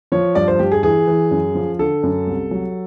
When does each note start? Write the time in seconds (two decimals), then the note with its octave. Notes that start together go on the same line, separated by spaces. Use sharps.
0.12 F3 C#5
0.35 G2 D5
0.48 C5
0.59 G2 G4
0.72 G#4
0.83 E3 G#4
1.07 E3
1.31 F#2
1.55 F3
1.79 D3 A4
2.03 F#2
2.27 C2
2.51 F#3